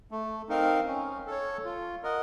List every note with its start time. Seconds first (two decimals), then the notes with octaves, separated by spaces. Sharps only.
0.11 A3
0.49 C4 D#4 A#4 F5
0.87 C#4
1.27 A4 C#5
1.65 F4
2.03 A#4 D#5 F#5